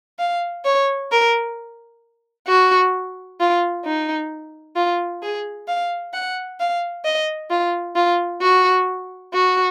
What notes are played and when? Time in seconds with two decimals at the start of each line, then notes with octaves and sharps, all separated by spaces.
0.19 F5
0.65 C#5
1.11 A#4
2.47 F#4
3.40 F4
3.85 D#4
4.76 F4
5.22 G#4
5.68 F5
6.13 F#5
6.60 F5
7.05 D#5
7.50 F4
7.95 F4
8.41 F#4
9.33 F#4